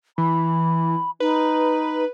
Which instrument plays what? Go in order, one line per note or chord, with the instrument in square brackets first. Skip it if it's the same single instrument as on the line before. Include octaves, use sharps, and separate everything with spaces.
[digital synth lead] E3 [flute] B5
[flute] D#4 [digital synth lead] B4